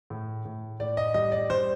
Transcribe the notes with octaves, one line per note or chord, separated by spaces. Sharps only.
A2
A2
A2 D5
D#5
G3 D#5
D5
G3 C5